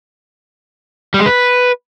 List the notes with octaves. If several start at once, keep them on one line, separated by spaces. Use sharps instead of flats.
G3
G#3
B4